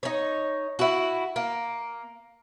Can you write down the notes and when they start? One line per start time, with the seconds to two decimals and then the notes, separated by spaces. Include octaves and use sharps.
0.03 D#4 C#5
0.79 E4 F#4
1.36 A#3